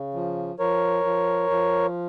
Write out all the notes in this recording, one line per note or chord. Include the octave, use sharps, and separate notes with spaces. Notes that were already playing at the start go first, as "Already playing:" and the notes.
Already playing: C#3
F3
F3 A#4 C#5
F3
F3